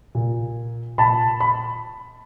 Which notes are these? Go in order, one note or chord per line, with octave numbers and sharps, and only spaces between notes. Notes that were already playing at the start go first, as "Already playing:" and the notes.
A#2
A#2 A5 B5
B5